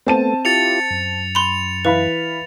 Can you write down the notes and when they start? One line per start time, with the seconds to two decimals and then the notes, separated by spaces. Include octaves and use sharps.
0.07 A3 B3 C4 A5 D#7
0.45 E4 F4 G4 A6 C#7 F7
0.90 F#2
1.35 B5 C6 F7
1.85 E3 B4 F5 B5